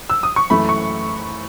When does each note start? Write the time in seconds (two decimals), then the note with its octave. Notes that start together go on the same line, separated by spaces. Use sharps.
0.10 E6
0.23 D#6
0.36 C#6
0.50 F#2 E3 A3 B5
0.69 C#6